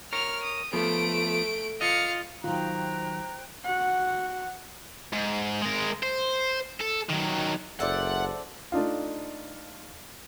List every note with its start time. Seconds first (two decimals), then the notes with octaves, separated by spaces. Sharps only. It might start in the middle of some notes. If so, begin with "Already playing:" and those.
0.13 A#4 C#5 F6
0.43 D#6
0.73 F3 A3 B3 D7
1.81 F4 D#5 F5 C#7
2.44 D#3 F#3 F4 C5 G5 A#5 F#6
3.64 F#4 F#5
5.13 G#2
5.62 G#3 A#4
6.03 C5
6.81 A4
7.10 D#3 F#3
7.80 F#1 A4 C5 D5 E5 F#5
8.72 A3 D4 D#4 F4